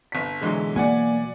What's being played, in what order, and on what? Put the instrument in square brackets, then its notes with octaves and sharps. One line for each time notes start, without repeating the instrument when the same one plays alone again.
[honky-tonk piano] G1 B6
[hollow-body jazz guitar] B1 E3 F#3 [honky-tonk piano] D3 G#3
[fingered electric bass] A#3 [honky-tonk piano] D5 F#5 G#5